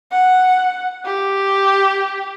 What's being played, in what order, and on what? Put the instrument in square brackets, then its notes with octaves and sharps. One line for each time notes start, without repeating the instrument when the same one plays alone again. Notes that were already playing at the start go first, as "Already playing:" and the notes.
[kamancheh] F#5
G4